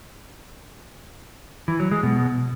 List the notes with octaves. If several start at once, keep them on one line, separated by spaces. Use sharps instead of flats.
E3
F#3
G#3
B2